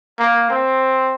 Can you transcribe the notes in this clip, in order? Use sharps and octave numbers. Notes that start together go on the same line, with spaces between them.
A#3
C4